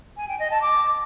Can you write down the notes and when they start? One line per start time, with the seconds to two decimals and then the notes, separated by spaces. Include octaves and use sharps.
0.17 G#5
0.28 G5
0.40 D#5
0.51 A5
0.62 D6